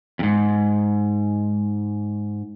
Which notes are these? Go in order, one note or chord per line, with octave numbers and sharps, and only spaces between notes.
F2 G#2